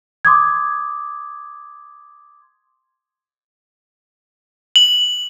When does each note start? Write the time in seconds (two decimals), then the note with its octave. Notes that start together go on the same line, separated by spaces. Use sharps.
0.25 C6 D6 D#6 G#6
4.76 F#7